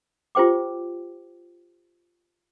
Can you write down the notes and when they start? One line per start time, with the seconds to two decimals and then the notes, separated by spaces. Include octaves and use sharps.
0.35 F4 G4 C5 G5 D6